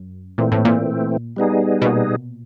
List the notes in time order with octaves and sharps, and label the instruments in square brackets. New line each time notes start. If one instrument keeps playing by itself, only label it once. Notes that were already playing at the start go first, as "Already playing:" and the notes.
Already playing: [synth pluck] F#2
[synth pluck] A#2 [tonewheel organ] E3 A3 C4
[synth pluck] A2
A#2
[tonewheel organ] G3 B3 D#4 G#4
[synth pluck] B2
A#2